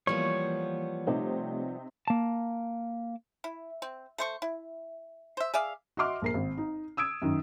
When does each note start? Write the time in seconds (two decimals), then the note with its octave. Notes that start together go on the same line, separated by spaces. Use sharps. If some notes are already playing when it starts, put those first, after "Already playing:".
0.07 E3 F3 G3 A#3 B3 C#5 C#6
1.07 C3 A3 C4 D#4 G4
2.08 A#3 A5
3.44 E4
3.82 C4
4.18 A3 C5 C#6
4.42 E4
5.37 C5 E5
5.54 G#4 D5 E5 F5
5.97 F#4 D#5 E5 C6 D6 F6
6.22 A#1 A#4 C7
6.34 G#1
6.58 D#4
6.97 D#6 E6 G#6 D7
7.22 F#2 D#3